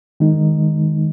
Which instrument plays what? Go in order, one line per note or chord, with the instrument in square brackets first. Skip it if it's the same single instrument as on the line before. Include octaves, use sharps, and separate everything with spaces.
[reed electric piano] D#3 G#3 D#4